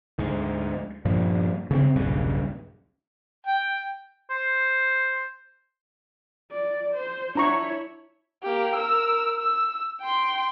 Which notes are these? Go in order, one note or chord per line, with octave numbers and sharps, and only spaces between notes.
D2 G#2
G2 A#2 F3
C#3 A#3 C4
D#1 B1 G2 C#3
G5
C5
D5
C5
D4 E4 C#5 A#5 C#6
A#3 G4
A#4 E6
E6
G5 C6